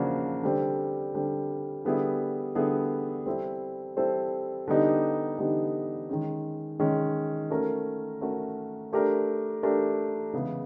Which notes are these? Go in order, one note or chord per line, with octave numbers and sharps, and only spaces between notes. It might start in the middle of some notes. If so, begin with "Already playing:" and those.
Already playing: C#3 F3 A#3 D4 F#4
D3 G3 C4
D3 G3 C4
D3 G3 B3 E4 G#4
D3 G3 B3 E4 G#4
G3 C4 E4 A4 C5
G3 C4 E4 A4 C5
D3 G3 B3 D#4 G4
D3 G3 B3 D#4 G4
D#3 G#3 C#4
D#3 G#3 C#4
A3 C#4 F#4 A#4
A3 C#4 F#4 A#4
A3 D4 G4 A#4
A3 D4 G4 A#4
C#3 E3 G#3 B3 E4